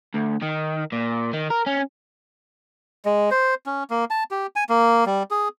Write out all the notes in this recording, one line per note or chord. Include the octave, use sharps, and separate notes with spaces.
D2
D#3
A#2
D#3
A#4
C#4
G#3
C5
C#4
A#3
A5
G4
G#5
A#3
G3
G#4